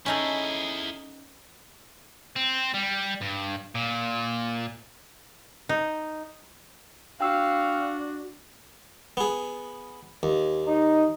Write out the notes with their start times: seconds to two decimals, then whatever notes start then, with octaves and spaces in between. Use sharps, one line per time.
0.06 C#4 D#4 E4 G#4 A4
2.36 C4
2.74 G3
3.22 G2
3.75 A#2
5.69 D#4
7.21 D4 F#4 F5 G5 E6
9.17 B3 G#4
10.23 D#2
10.67 D#4